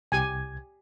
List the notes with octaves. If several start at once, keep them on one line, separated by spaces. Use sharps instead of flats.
C2 G4 G#5 G#6